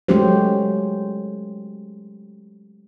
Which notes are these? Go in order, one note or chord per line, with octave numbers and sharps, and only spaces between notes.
F#3 G#3 A3 C#4 G4 C5